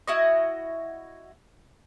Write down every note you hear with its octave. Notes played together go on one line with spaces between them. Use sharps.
E4 F#4 D#5